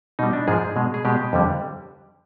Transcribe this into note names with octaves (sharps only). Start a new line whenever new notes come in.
B2 G3 D#4
D4
G#2 F3 G#3 G#4
B2 G#3
G#4
B2 G#3 G4
F2 D3 G3